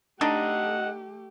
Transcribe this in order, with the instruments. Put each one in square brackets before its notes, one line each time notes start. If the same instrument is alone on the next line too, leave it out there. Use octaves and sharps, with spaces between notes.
[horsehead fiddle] A3 G4 [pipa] D4 D#4 [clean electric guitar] A4 D#5 [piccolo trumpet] F#5